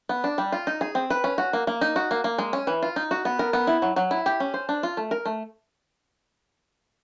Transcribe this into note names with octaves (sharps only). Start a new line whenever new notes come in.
B3
D4
G3
F4
D#4
G#4
C4
B4
C#4
F#4
A#3
A#3
D#4
F#4
A#3
A#3
G#3
C#4
E3
F4
D#4
F#4
B3
A#4
B3
E4
F#3
F#3
E4
G4
C#4
C5
D4
F4
A3
A#4
A3